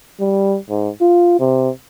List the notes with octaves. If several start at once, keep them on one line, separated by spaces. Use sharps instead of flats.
G3
G#2
F4
C3